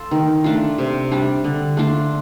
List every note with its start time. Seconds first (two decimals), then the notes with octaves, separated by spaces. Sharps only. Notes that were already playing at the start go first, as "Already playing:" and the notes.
Already playing: F4 A4
0.11 D#3
0.44 A3 D4 F4
0.78 C3
1.11 G3 D4
1.44 D3
1.77 A3 D4 F4